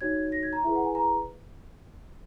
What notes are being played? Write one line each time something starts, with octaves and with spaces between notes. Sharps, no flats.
D#4 F#4 C#5 G#6
A#6
G#6
A#5
E4 G#4 B4 E5
F#5
G#5
A#5